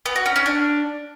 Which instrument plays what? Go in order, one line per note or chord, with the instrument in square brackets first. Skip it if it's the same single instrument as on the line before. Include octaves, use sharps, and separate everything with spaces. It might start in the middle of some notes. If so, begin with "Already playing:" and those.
[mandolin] B3
F#4
C#4
C#4
D4